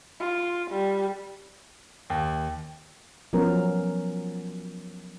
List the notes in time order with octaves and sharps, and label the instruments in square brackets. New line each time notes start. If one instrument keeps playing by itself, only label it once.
[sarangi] F4
G3
[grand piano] D#2
[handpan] F3 F#3 B3 C#4 A#4